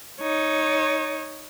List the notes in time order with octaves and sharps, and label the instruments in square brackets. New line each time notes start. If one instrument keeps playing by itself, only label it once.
[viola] D#4 C#5